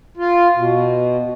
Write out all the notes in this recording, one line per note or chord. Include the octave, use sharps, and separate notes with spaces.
F4
B2